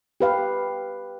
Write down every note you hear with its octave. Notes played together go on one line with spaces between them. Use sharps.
G4 B4 F5